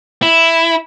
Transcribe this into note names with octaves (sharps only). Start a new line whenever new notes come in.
E4